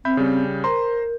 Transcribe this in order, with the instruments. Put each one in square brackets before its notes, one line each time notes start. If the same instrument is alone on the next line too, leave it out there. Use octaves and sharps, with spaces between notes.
[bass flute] C4 [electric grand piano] E5 B5 G6
[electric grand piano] C#3 G3
[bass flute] A#4 [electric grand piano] C5 A#5 C6